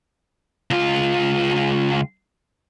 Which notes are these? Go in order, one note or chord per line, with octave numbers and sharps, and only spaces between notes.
C#2 F4